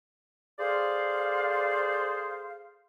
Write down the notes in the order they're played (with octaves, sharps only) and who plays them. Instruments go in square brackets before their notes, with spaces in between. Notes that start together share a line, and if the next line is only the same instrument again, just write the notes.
[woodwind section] G#4 A4 C5 D5 F5